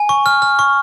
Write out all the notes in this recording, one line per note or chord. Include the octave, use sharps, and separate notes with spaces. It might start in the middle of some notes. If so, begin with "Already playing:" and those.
Already playing: G#5
C#6
F6
F6
C#6